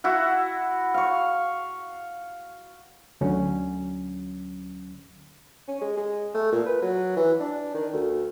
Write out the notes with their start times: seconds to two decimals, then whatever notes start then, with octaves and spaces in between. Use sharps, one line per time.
0.04 E4 F#4 F#5
0.94 F5 C#6
3.21 D2 D3 F#3 C#4
5.68 C#4
5.81 G#3
5.97 G#3
6.35 A3
6.52 A#2
6.66 B4
6.82 F#3
7.16 E3
7.40 D4
7.75 D#3
7.93 D2